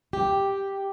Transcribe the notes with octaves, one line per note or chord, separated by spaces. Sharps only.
G4